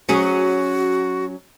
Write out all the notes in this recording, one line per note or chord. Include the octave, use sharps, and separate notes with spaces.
F#3 C#4 F#4 G#4